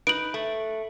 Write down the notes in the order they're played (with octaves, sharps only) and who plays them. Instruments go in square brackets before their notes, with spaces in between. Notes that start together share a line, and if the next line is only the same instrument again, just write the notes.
[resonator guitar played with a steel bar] D#4 B4 [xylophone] D7 F#7
[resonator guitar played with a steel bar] A3